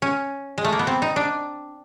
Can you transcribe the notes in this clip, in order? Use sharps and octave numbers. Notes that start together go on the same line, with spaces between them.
C#4
G#3
A3
A#3
B3
C4
D#4
D4